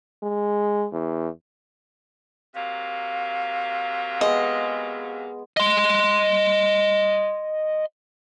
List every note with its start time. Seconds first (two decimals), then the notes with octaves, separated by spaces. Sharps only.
0.23 G#3
0.92 E2
2.55 C3 F#3 A#3 F5
4.21 G#3 B3 D#5
5.57 D#5 C6